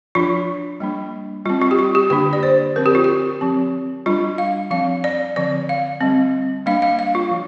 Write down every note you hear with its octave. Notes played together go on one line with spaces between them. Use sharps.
F3 D4 F4
G3 A#3 D4
G3 C4 F4
F4
G4
F4
G4
D3 A#3 D4 G4
D5
C5
F3 C4 A#4
G4
F4
G4
F3 C4
G3 D4 F4
F5
F3 C4 F5
D5
D3 F3 C4 D5
F5
G3 C4
G3 A#3 D4 F5
F5
F5
F4
F3